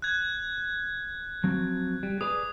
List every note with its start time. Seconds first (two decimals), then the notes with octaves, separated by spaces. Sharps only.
0.02 F#6 G#6
1.44 F3 F#3 C4
2.03 G3
2.21 G#4 B4 D5 D#6